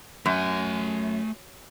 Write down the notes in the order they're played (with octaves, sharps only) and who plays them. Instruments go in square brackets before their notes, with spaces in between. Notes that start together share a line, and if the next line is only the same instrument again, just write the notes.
[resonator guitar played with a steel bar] F#2 [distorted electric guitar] A3 G#5